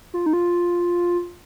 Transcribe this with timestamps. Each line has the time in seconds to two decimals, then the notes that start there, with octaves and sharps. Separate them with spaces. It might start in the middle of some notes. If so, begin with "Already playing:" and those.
0.14 F4
0.26 D#4
0.33 F4